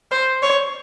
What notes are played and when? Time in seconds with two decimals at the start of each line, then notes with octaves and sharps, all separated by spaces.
0.11 C5
0.43 C#5